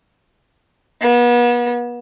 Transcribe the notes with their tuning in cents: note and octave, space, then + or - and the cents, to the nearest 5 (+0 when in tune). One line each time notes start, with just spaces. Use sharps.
B3 -40